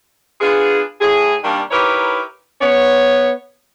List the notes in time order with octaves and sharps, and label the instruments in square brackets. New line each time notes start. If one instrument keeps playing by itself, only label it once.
[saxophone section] B3 D4 F4 G#4
A2 G#4
D#3 G3 A#3 D4
D#4 E4 G4 A#4 B4 C#5
[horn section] B3 C#5